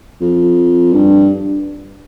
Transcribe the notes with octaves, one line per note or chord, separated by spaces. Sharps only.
F2
G2